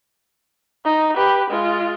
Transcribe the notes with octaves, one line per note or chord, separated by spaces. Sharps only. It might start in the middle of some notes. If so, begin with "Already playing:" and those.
D#4
G4 B4
G#3 F4